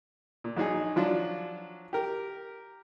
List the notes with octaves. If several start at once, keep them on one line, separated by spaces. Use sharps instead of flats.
A#2
A#1 F#3 D#4 G#4
F3 F#3 D4 F4
G4 A#4